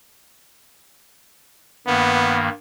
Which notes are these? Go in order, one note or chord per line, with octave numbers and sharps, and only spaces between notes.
G2 D#3 A#3 B3